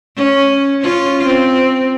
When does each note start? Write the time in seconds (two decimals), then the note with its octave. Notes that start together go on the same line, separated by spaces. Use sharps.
0.17 C#4
0.82 C#4 F4
1.26 C4